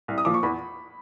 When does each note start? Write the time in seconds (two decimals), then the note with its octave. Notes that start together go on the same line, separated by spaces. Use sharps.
0.08 C2
0.18 D#6
0.25 A#2 F3 D6
0.34 C#6
0.43 E2 B5